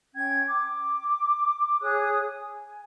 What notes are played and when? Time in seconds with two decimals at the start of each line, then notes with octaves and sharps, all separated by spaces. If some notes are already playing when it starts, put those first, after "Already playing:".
0.13 C#4 G5 G#6
0.48 D6
1.80 G#4 C#5 D#6 F#6
2.39 G#5